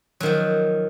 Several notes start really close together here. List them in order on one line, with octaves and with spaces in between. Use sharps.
F#3 D#3 F3